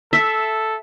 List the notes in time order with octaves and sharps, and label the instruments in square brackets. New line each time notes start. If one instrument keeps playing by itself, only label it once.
[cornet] A4 [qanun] E5